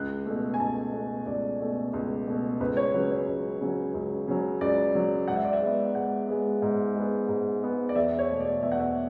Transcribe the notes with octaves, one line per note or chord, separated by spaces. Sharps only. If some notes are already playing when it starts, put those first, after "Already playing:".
Already playing: C#2 F#6
B2 A3
G#5
C#2 A5
B2 A3
C#2 D5
B2 A3
C#2
B2 A3
C#2 B4
C#5
C#3 F#3 B4
C#5
C#2
C#3 F#3
C#2
C#3 F#3
C#2 D5
C#3 F#3
G#2 F#5
E5
D5
E5
G#3 B3
G#2 F#5
G#3 B3
G#2
G#3 B3
G#2
G#3 B3
D5
E2 E5
C#5
B2 A3
D5
E2 E5
F#5
E5